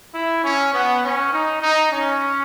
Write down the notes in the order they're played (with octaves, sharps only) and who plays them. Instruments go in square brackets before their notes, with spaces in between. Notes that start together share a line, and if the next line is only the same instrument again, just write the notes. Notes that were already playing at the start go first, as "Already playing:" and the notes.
[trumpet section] E4
C#4
B3
C#4
D#4
D#4
C#4